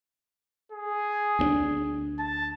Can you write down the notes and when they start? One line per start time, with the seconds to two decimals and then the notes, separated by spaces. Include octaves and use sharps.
0.72 G#4
1.39 D2 B3 D4
2.19 A5